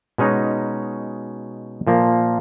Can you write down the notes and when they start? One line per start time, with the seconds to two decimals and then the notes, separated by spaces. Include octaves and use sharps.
0.18 B2 G#3 C#4 D#4
1.87 A#2 F3 A#3